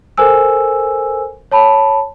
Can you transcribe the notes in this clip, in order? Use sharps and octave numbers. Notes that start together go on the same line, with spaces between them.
A4 A#4 C5 G#5 E6
C#5 A5 B5